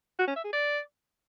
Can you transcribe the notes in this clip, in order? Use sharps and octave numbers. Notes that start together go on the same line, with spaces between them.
F#4
C#4
E5
G#4
D5